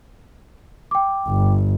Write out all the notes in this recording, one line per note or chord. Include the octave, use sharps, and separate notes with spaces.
G5 D6
G1